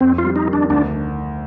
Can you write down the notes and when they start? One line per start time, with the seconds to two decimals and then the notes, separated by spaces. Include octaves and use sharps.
0.01 F2 C4
0.18 F4
0.24 G3
0.36 D#4
0.47 D#3
0.53 D4
0.70 D2 D4